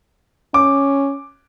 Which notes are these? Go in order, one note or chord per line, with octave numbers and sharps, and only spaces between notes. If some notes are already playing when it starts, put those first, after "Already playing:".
C#4 D6